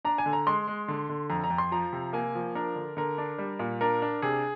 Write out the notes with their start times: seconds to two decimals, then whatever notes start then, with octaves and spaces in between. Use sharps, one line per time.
0.04 D4 A#5
0.18 G#5
0.26 D3
0.33 A#5
0.46 G#3 C6
0.67 G#3
0.88 D3
1.09 D3
1.30 F2 A#5
1.44 A#5
1.50 F2
1.58 C6
1.72 F3 A#5
1.93 C3
2.13 A#3 G#5
2.35 F3
2.55 D4 A#4
2.76 D3
2.97 D3 A#4
3.18 D4
3.39 G3
3.59 A#2
3.81 D4 A#4
4.02 D4
4.22 C3 G#4